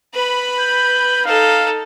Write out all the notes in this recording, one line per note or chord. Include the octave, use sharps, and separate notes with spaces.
B4 B5
G6
D#4 A4 F5